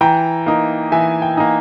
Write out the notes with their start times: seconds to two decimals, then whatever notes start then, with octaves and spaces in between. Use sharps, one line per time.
0.01 E3 G5 A#5
0.46 A#3 D#4
0.92 E3 E5 G#5
1.22 G5
1.37 A#3 D#4